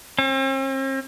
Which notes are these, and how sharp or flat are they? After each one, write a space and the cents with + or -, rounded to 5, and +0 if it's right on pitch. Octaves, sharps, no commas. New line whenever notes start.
C4 +45